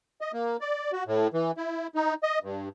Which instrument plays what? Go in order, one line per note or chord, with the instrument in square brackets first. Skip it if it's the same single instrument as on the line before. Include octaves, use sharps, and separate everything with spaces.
[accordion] D#5
A#3
D5
F#4
A2
E3
E4
D#4
D#5
G2